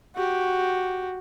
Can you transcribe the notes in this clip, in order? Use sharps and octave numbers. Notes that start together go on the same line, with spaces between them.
F#4 G4